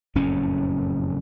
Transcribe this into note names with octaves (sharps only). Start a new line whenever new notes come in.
F#1 F2 A2 C#4